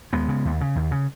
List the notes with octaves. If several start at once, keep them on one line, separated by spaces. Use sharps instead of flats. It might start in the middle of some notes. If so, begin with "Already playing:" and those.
D#2 G#3 B3
C#3
D#2
C#3
D#2
C#3